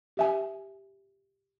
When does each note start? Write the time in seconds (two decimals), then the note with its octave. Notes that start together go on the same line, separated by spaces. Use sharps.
0.17 G4 E5 G#5